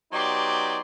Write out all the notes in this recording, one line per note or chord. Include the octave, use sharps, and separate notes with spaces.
F#3 B3 D#4 G4 D5 C6